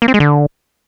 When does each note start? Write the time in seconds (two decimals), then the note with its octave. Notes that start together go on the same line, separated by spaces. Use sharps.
0.02 A#3
0.08 C4
0.14 G#3
0.20 D3